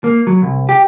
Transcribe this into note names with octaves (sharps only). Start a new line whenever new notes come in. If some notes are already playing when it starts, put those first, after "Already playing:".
A#3
F#3
C2
G4